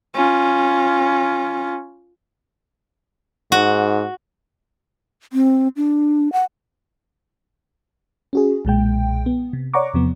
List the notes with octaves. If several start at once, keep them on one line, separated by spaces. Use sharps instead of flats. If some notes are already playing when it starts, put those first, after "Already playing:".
C#4 F4
G#2 F#4
C4
D4
F#5
C#4 F#4 G#4
B1 A#2 G#3 G5
B3
C3
C#5 D5 F#5 A#5 C#6 D6
E2 C3 F3 B3